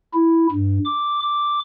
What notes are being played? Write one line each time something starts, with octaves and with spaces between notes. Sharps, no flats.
E4
G2
D6
D6